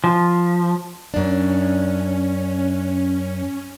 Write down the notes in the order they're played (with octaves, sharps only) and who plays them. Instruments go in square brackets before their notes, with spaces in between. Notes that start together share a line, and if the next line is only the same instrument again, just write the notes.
[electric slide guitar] F3
[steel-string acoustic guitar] F#2 D4 [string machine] C#4